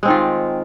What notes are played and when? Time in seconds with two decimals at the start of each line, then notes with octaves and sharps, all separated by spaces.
0.03 G#3
0.05 C4
0.08 D#3
0.10 F4